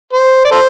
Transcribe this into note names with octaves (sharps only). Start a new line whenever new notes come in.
C5
D5
A4 C5